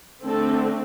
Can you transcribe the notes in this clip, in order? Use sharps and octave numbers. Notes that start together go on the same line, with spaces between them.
D3 A3 C4 A4